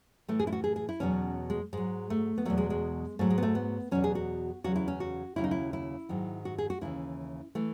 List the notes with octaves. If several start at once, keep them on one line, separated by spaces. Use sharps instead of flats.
A2 E3 A3
G#4
E4
F#4
G#4
G#4
E4
E2 B2 F#3 C#4
G#3
G#2 F#3 G#3
A3
B3
E2 B2 F#3 A3
G#3
G#3
G#2 F#3 A3
G#3
B3
A3
B3
E2 B2 F#3 C#4
G#4
F#4
E2 C#3 F#3 F#4
E4
C#4
F#4
D#2 C#3 F#3 E4
D#4
E4
E4
G#2 D#3 F#3
F#4
G#4
F#4
D#2 C#3 E3 E4
E3 A3